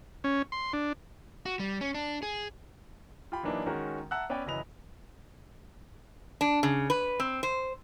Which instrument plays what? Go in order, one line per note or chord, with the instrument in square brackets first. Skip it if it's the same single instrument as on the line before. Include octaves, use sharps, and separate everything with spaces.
[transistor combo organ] C#4
C6
D4
[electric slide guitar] F#4
G3
C#4
D4
G#4
[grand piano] F4 G4 G5 B5
E3 F#3 A#3 D4 D#4 B4
D#3 G#3 C#4 F#4 A#4
E5 F#5 A5 A#5 E6 F#6
B3 C#4 B4 D5 G5
F#1 E3 F#3 D#5 B5 F7
[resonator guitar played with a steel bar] D4
C#3
B4
C4
C5